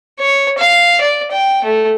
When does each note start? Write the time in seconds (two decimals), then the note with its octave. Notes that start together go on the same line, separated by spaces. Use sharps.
0.20 C#5
0.58 F5
1.01 D5
1.31 G5
1.64 A3